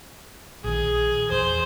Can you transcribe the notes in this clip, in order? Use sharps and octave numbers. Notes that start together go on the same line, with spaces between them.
A#1 D#3 G#4
E2 C5